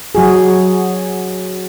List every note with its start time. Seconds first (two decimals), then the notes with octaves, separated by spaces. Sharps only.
0.15 F#3 F#4 G#4